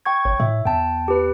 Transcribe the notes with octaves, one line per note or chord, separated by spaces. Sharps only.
G5 C#6 G#6
G1 C#5
A2 E5
E2 G5 A5
G4 B4